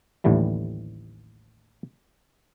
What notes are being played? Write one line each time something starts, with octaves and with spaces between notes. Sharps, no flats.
A1 D#2 A2 D3 E3 G3